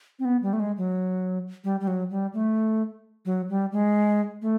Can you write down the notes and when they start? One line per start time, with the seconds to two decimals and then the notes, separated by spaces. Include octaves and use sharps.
0.19 C4
0.25 B3
0.42 G3
0.53 A3
0.60 G#3
0.78 F#3
1.64 G3
1.80 G3
1.87 F#3
2.10 G3
2.34 A3
3.26 F#3
3.49 G3
3.72 G#3
4.42 A3